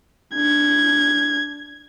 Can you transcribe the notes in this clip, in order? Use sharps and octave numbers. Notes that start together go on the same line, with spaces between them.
D4 G#6